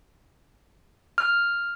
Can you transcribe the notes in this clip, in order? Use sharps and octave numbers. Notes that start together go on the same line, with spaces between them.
F6